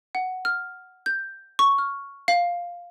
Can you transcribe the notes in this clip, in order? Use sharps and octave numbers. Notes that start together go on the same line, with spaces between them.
F#5
F6
G6
C#6
F6
F5